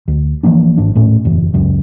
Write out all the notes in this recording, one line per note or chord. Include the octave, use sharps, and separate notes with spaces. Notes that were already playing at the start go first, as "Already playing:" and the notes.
D2
E3 F3 A#3 D4
G#1 D4
D#1 A2 C#4
F#1 E2
C#2 F#2